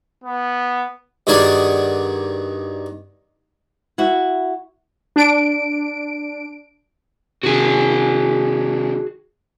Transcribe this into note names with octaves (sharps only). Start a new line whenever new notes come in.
B3
G2 D#3 F#4 G#4 D5 F#5
E4 F#4
D4 D7
C3 D#3 F#4 G#4